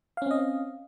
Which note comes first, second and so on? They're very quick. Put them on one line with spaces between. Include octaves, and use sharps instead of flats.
F5 C#4 C4 D#5